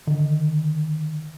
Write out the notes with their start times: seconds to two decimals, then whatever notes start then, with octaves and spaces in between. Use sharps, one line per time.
0.07 D3 D#3